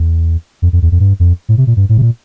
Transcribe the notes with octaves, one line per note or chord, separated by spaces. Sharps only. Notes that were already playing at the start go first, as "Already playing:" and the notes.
Already playing: E2
F2
F2
E2
F2
G2
F2
A2
C3
A#2
G2
A2
C3
A#2